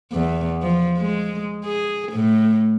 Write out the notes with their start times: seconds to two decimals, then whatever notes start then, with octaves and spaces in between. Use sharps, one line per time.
0.13 E2
0.62 F3
0.98 G#3
1.64 G#4
2.12 A2